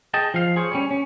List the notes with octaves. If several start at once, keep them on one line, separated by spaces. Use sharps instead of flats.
G#4 D#5 G5 A5
F3 F5
G#4 C5 C#5
G3 C#4
C#4